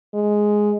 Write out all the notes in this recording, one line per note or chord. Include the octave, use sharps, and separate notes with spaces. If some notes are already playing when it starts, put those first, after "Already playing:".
G#3